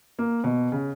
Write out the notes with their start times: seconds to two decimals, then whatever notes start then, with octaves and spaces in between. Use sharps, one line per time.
0.19 A#3
0.44 B2
0.72 C#3